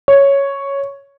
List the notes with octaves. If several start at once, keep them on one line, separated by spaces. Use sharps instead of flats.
C#5